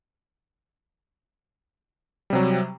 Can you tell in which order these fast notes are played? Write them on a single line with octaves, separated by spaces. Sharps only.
G3 C3 F#3